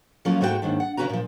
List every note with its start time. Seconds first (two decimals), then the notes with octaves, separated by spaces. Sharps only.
0.25 F3 F#3 A3 A#3 C#4 F4
0.41 G#2 G#3 A3 F#4 B4 G5
0.62 D#2 G#2 D#3 D4
0.80 F#5
0.97 C#3 C#4 F#4 B4 A#5
1.09 A#2 F3